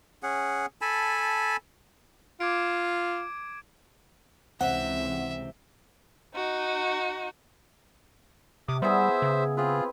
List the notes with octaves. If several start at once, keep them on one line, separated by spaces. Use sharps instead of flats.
C#4 G#4 F#5
A4 G#5 A5 B5
F4 D6 G#6 D7
C#2 C3 E3 C4 E5 F#5
D#4 F#4
C3 D6 D#6
G3 B3 E4 G#4 C5 E5
C#3
C4 F4 G#4 B4